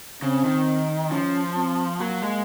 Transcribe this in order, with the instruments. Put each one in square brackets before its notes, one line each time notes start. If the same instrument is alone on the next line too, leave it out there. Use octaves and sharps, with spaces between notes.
[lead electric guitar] C#3 [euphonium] C4
[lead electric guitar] D#3
[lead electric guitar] F3 [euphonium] C#4
[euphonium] C4
[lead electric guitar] F#3 [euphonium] A#3
[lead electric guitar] G#3